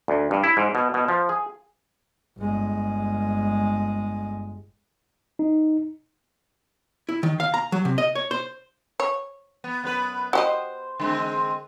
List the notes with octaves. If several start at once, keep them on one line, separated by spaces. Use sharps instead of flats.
D2
G2
E4
G#2
B2
B2
F3
G#4
G1 G#3
D#4
E4
D#3
F5
A#5
F#3
C3
D#5
C#5
C5
C#5
B3
F#2 B3 B4
F#4 G4 C5 D#5
D3 G#3 C4